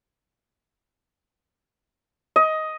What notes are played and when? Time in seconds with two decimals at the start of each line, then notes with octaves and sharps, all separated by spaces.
2.36 D#5